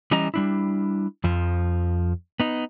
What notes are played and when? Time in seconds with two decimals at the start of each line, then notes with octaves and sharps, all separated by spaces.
0.11 E3 G3 C#4 D#5 A#5
0.34 G3 D4 E4
1.24 F2 F3
2.40 B3 D#4